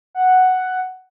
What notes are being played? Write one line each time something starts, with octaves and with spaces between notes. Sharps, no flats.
F#5